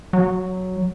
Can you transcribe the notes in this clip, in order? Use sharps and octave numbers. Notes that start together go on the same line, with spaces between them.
F#3